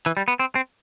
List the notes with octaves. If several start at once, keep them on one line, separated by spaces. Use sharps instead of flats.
E3
G3
B3
C4
C4